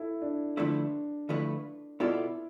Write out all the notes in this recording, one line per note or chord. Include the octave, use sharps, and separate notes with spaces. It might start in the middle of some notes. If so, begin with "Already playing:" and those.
Already playing: E4 A4
D4
D3 F3 A3 D4 E4 B4
D3 F3 A3 E4 B4
B2 B3 E4 F4 A4 D5